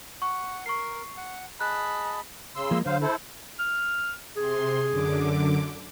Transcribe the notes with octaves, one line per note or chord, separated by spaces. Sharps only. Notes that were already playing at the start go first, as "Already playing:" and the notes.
F#5 C#6
A#4 C#6 C7
F#5
G#4 D#5 A5 B5 F#6
C#3 C6 E6
F3 G#3 A#3
D3 F#3 C5 F5
E4 A4 C5
F6
C3 G#4 C6
F#2 D3 D6